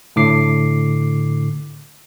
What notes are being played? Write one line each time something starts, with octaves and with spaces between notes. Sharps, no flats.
A2 D3 D6 C7